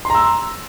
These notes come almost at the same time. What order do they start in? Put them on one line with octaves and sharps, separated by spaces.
C6 A#5 E6